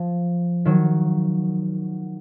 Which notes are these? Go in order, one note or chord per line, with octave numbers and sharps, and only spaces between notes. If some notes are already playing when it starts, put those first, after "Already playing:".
Already playing: F3
D#3 F#3